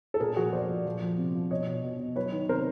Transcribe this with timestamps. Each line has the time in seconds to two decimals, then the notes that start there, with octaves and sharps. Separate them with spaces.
0.14 A4
0.20 A#2 G#4 A#4
0.36 F3 F#4 G#4
0.53 F3 C5 D5
0.69 A#2
0.86 F3
1.02 F3
1.18 C3
1.35 F3
1.51 B2 C#5 D#5
1.67 B2
1.84 B2
1.99 B2
2.16 F#3 B4 C#5
2.32 D#3
2.49 C3 A#4 C5